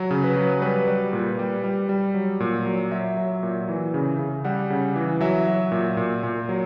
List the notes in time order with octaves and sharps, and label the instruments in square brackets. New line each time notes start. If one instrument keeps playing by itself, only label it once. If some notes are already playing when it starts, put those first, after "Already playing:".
Already playing: [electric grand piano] F#3
C#3
B4
F#3
G3 B4
G3
A#2
G3
G3
G3
F#3
A#2
F#3
F#3 E5
F#3
A#2
E3
C#3
C#3
G3 F#5
C#3
E3
F#3 E5
F#3
A#2
A#2
A#2
F#3